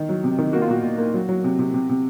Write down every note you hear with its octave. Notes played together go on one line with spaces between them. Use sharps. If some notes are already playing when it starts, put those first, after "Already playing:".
Already playing: D#3
F#3
C3
D#3
A#3 F#4
F4
A#2 F#4
A#2
A#3
F#3
F#3
C3
C3
C3
C3